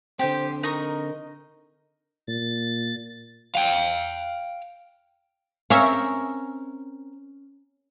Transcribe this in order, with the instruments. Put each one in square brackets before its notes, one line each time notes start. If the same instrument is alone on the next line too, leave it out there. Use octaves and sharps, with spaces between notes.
[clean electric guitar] D3 C4 [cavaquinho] G4 G5 [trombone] C5
[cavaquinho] D#4 D#5 C#6 [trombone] A#4
[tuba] A#2 [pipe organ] A6
[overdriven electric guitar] F5 G5
[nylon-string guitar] C4 A#4 [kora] C#4 [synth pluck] E5 F5 C#6